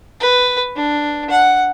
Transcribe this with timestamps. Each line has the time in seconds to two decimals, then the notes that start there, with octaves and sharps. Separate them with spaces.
0.20 B4
0.76 D4
1.30 F#5